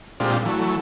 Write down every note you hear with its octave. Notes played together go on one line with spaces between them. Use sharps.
A#2 G#3 C4 D4 F4 G4
E3 F#3 A3